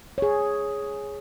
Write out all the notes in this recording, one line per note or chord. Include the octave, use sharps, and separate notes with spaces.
G#4 C#5